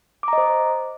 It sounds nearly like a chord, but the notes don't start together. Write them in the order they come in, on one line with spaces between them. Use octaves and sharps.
D6 A#5 D#5 C5